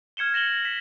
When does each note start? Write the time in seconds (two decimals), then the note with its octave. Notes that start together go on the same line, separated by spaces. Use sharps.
0.17 F6 G#6 C#7 E7 G7
0.34 A#6 E7 F#7 G7
0.65 B6 E7